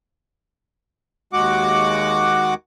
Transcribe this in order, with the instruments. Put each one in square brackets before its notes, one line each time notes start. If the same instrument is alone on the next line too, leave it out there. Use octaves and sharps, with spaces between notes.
[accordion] D#2 G#3 F#4 F#5 D6